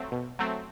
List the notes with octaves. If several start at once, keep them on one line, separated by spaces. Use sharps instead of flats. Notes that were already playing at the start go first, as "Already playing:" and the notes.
Already playing: F#3 A3 C4
B2
F#3 A3 C4